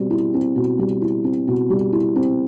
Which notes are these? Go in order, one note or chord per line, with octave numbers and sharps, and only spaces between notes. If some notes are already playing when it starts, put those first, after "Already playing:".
Already playing: B2 G3 C4
E4
C4
B2
G3
E4
C4
B2
G3
E4
C4